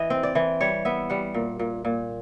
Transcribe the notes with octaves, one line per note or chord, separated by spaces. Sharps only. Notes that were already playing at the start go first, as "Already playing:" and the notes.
Already playing: E3 D#5
C4
D5
E3
G3 C#5
B3 E5
G3 F#5
A#2
A#2
A#2